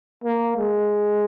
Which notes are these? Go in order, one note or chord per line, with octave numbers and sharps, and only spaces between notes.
A#3
G#3